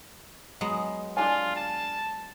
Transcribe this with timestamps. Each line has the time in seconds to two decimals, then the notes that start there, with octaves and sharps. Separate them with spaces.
0.61 F#3 G#3 B3
1.17 D4 F4 G#4 G#5
1.56 A5